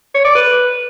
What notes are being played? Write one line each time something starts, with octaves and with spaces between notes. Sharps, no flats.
C#5
D5
B4